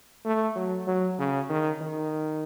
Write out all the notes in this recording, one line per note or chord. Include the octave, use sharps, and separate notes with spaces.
A3
F#3
F#3
C#3
D#3
D#3